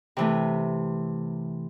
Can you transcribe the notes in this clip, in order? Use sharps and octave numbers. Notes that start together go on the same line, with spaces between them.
C3 E3 A3